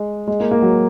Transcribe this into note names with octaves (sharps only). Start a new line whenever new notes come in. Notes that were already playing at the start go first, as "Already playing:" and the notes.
Already playing: G#3
G#3
A#3
A#3
F#3